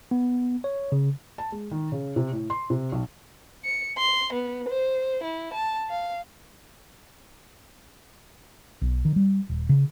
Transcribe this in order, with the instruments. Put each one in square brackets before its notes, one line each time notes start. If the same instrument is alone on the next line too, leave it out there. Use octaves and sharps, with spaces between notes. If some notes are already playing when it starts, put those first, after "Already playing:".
[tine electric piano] B3
C#5
C#3
[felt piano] A5
G#3
D#3
C#3
C3
A2
C6
C3
B1
[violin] C#7
C6
B3
C5
E4
A5
F5
[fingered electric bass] B1
D#3
G3
D#1
C#3